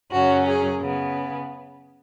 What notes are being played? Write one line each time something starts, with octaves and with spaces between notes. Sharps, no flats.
F#2 C#3 F#3 C#4 F#4
G#4
C#3 B3